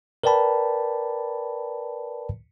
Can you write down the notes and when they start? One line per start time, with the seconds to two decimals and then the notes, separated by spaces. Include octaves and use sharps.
0.24 A#4 B4 D5 G5 A5 B5